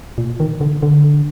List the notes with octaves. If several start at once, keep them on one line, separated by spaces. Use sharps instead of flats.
A#2
D#3
D3
D3